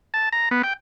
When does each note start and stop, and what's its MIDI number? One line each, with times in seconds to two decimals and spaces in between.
0.14 0.29 81
0.32 0.49 82
0.51 0.62 59
0.63 0.73 79